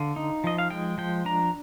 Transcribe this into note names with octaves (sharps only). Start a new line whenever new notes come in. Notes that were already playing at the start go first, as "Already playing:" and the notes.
Already playing: D3 F5
D#4
F3 D#5
F5
G#3 G5
F3 G5
D4 A#5